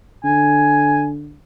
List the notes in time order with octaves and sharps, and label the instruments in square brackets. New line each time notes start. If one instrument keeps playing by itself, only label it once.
[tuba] D3 [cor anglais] G#5